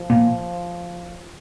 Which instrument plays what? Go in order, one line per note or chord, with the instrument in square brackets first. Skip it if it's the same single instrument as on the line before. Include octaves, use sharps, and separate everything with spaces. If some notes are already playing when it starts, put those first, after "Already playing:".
Already playing: [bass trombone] F3
[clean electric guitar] A#2